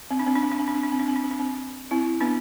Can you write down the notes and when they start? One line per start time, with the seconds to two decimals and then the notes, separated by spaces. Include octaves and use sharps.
0.11 C4
0.19 D4
0.26 C4
0.35 D4
0.43 C4
0.52 D4
0.59 C4
0.68 D4
0.75 C4
0.84 D4
0.92 C4
1.00 D4
1.08 C4
1.16 D4
1.24 C4
1.31 D4
1.40 C4
1.91 C4 E4
2.21 B3 D4